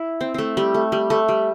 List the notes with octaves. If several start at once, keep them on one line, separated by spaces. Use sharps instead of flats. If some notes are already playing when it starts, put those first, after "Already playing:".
Already playing: E4
C4
A3 C4
G3
A3
G3
A3
G3